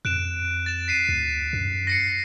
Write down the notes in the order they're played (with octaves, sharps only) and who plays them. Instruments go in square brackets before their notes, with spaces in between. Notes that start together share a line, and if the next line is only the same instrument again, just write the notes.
[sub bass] F2 [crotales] F#6 D7 E7
[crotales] A6 E7
B6 C7 D#7
[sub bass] D2
F#2
[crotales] A#6 C7 C#7